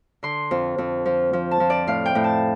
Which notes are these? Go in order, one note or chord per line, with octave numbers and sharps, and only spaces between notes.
D3 C6
F2
F2
F3
F3
A5
F3
D5
A2 F5
G5
A2
A5